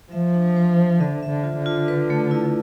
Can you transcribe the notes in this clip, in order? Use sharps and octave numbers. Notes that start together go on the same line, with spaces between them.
F3 E5
D4
C5
E5
D3 E5
E5
D3
F4
D3
F4
B4
A3
E4